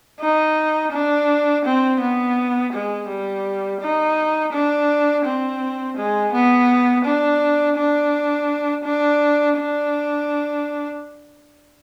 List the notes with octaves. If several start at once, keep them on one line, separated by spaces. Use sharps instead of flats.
D#4
D4
C4
B3
G#3
G3
D#4
D4
C4
G#3
B3
D4
D4
D4
D4